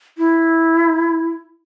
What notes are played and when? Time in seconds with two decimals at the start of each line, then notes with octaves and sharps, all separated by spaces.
0.18 E4